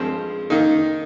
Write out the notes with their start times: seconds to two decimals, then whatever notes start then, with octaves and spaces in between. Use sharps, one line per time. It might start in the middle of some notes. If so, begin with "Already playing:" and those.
Already playing: G2 F3 G#3 C4
0.50 D#3 A#3 D#4